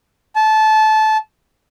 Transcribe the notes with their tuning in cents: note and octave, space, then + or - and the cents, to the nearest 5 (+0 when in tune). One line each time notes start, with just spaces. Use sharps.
A5 -20